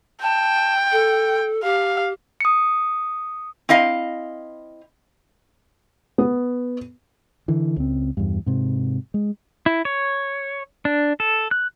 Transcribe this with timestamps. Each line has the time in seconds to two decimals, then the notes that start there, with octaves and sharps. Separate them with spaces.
0.23 G5 A5
0.92 A4
1.64 G4 F5
2.41 D#6 C#7
3.69 C4 E4 D#5 F5
6.18 B3
7.48 D3 E3
7.77 C#2 C4
8.17 E2 G2
8.46 G#2 C3
9.14 G#3
9.66 E4
9.85 C#5
10.85 D4
11.20 A4
11.51 F#6